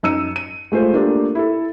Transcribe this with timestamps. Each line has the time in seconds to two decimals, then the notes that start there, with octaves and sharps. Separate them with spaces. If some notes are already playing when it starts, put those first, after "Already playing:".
0.03 F#2 D#4 E6 C#7 D#7
0.36 D#7
0.72 G#3 A3 F4 C5
0.93 A3 A#3 D4 F4 G4
1.35 E4 A4